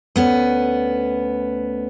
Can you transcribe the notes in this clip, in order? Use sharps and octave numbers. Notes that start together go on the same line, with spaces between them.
D2 B3 C#4